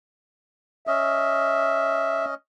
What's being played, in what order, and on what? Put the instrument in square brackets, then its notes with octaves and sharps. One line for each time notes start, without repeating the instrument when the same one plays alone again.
[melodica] C#4 D#5 [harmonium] E5